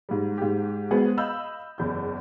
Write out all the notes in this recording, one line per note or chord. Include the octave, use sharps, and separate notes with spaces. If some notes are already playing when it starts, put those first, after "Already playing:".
G#2 G3
G#2 G4
G#3 B3 C4 F#4 G#4
D#5 F5 B5 E6 G6
F#1 E2 G6